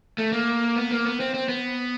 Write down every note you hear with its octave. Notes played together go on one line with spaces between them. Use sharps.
A3
A#3
B3
A#3
B3
C4
C4
B3